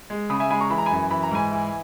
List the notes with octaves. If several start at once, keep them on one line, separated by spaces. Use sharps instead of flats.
G#3
C#3 B5 D#6
E5 G#5
G#3 G#5 B5
A#5 C#6
E3 B5
A#5
F#2 G#5 B5
E3 B5
A#5
G#2 G#5 B5
E3